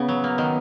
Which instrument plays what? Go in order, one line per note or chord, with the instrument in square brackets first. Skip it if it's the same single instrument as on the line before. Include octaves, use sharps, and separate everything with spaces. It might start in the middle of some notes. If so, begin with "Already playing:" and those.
Already playing: [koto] C#3 [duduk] B3
[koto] F#3
A#3
D#3